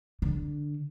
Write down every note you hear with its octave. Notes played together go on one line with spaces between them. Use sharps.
D3